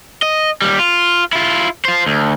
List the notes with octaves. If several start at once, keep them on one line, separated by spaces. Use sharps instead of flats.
D#5
D#2 G3
F4
E4 F4
F4 C5
D2